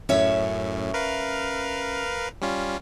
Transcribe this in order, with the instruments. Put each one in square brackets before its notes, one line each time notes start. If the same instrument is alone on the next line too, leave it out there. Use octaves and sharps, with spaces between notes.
[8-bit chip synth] F#2 A2 [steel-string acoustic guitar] C#4 C#5 E5
[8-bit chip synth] A#4 B4 F5
G3 C#4 F4